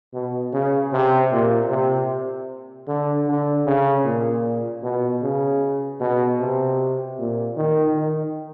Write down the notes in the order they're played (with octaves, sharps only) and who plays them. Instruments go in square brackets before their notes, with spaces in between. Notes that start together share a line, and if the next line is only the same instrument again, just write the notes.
[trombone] B2
C#3
C3
A#2
C3
D3
D3
C#3
A#2
B2
C#3
B2
C3
A#2
D#3
D#3